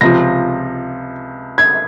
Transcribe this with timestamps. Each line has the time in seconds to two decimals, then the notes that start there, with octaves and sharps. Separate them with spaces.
0.01 C#2 C3 F3 A#6
1.58 G#6